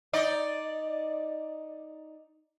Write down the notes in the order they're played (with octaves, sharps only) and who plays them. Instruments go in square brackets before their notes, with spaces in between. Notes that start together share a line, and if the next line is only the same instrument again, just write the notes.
[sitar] D#4 D5 D#5